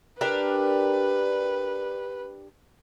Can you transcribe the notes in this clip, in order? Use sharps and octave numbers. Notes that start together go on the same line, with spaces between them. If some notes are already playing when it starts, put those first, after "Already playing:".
D4 G4 A#4 B4